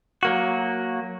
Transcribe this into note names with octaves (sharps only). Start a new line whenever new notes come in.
F#3 A#3 F#4